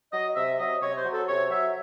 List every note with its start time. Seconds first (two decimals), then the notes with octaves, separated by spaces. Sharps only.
0.12 F#3 D#5
0.35 C3 E5
0.59 F#3 D#5
0.81 C3 C#5
0.96 C5
1.05 F#3
1.12 A4
1.28 C3 C#5
1.50 F#3 E5